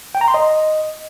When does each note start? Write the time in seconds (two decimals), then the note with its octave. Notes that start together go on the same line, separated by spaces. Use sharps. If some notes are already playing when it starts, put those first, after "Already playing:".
0.15 G5
0.21 A#5
0.28 C6
0.34 D#5